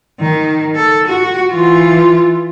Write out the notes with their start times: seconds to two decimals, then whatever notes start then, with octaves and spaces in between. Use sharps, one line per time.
0.20 D#3
0.75 A4
1.08 F#4
1.52 E3 F4